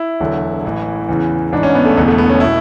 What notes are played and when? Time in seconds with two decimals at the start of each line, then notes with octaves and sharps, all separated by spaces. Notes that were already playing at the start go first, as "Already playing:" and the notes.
Already playing: E4
0.20 E1 E2 D3 F#3
0.65 A1 A2 E3
1.09 E2 C#3 E3
1.52 A1 G#2 E3 D4
1.63 C#4
1.75 B3
1.85 A3
1.97 E1 E2 D3 B3
2.08 A3
2.18 B3
2.30 C#4
2.40 B2 E4